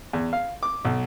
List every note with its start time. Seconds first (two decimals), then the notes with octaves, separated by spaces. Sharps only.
0.13 E2
0.33 F5
0.63 D6
0.85 B1